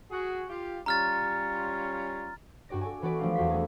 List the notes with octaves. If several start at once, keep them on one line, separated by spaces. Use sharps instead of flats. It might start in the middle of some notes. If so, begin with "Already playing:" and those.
F#4 G#4
F4 G4
G3 C#4 F4 A#5 F6 A6
G2 F#4 G4 D5 A#6
A4 D5 G#5
E3 B3 F#4 B4 D5
F3 F#3 A3 D4 G4 F5
E2 G#3 F#4 C5 B6
B3 F#4 G#4 A4